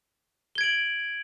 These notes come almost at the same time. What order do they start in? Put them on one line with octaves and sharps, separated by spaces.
G7 G#6 D7 F#7